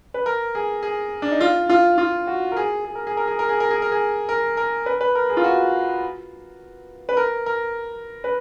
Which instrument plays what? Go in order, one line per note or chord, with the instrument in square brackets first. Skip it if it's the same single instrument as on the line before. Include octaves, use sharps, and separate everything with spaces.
[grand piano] B4
A#4
G#4
G#4
D4
D#4
F4
F4
F4
F#4
A#4
G#4
G#4
A#4
G#4
A#4
G#4
A#4
G#4
A#4
G#4
A#4
G#4
A#4
A#4
B4
B4
A#4
G#4
F4
F#4
B4
A#4
A#4
B4